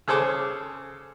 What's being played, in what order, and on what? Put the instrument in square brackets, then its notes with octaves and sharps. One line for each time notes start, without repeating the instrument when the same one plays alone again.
[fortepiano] C#3 G#4 A4 C5 D6